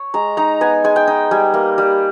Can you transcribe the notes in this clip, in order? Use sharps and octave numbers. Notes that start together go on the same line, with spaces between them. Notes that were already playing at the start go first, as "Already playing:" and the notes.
Already playing: C#5
G#3 A#5
D#4 A#5
B3 G#5
G#3 G#5
G5
D#4
G3 G#5
A#3
G3